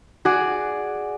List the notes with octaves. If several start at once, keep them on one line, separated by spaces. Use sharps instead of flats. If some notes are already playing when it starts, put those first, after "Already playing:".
F#4 G#4 D5